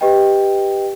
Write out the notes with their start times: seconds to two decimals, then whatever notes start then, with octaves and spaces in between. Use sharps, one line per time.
0.01 G4 B4 D#5 G5